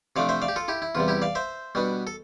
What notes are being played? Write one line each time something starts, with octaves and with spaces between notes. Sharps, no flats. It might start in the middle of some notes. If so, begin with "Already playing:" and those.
C3 F3 A3 D4 D5 F5
C5 E5
D5 F5
G4
F4 A4
E4 G4
E4
E2 C3 G3 F4
E4 G4
D5 F5
C5 E5
B2 G3 B3 D4
A4